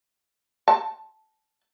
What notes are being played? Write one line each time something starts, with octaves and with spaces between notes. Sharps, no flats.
A5